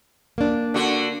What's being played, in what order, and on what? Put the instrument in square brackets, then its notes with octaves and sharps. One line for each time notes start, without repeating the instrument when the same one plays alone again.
[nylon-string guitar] A#3 D4
[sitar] D3 F#4